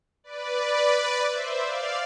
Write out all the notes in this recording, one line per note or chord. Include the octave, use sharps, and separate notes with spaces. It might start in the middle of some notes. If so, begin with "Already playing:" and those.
B4 D5
C5 E5
D5 F5